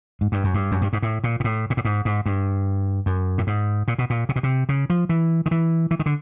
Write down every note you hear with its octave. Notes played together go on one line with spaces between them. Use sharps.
G#2
G2
F#2
G2
F#2
G2
G#2
A2
A#2
A#2
A2
A#2
A2
G#2
G#2
G2
F#2
A2
G#2
A#2
B2
A#2
C3
B2
C3
C#3
F3
E3
D#3
E3
E3
D#3
D3